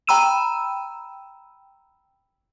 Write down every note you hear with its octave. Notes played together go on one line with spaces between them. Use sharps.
G5 A#5 B5 E6 D#7 E7